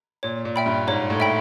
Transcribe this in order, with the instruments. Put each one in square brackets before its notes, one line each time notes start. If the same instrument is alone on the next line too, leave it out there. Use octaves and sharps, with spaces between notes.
[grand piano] A#2 [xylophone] C#5
[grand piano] A#2
[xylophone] E5 G5 B5
[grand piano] G2
[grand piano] G#2 [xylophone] C#5
[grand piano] A2
[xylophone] E5 G5 B5